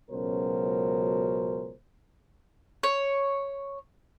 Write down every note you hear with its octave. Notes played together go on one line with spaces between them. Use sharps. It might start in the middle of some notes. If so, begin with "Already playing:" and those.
C#2 B2 F#3 C#4 A#4 C5
C#5